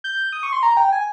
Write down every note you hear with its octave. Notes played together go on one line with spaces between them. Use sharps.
G6
D#6
C#6
C6
A#5
G5
G#5